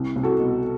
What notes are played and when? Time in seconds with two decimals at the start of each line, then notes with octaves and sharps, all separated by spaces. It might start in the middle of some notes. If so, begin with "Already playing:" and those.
Already playing: C2
0.16 C2
0.23 F#4 A4
0.39 B2